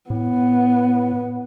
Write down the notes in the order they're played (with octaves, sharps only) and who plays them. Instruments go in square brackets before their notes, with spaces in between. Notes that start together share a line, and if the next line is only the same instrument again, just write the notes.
[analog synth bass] A2 [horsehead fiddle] B3